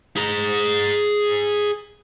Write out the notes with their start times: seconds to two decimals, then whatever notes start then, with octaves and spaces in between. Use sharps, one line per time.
0.16 G#4 A#5